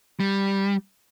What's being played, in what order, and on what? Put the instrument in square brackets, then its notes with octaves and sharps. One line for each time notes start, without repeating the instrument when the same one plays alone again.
[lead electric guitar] G3